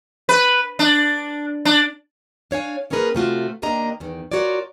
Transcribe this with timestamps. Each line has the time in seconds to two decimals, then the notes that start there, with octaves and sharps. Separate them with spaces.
0.29 B4
0.79 D4
1.65 D4
2.51 D4 C#5 F5 G#5
2.90 A#3 C#4 F4 G#4 A#4 B4
3.15 C3 A3 F4 F#4
3.62 D#2 C3 A#3 D4 D#5 A#5
4.00 E2 D#3
4.32 F4 F#4 A#4 C#5 D5